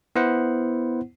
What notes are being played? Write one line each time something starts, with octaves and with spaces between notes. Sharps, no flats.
B3 E4 C5 F#5